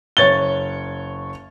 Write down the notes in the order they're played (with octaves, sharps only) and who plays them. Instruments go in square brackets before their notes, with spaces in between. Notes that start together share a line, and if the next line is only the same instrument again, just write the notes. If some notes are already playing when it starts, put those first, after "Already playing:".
[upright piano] F#1 C#5 A6 G7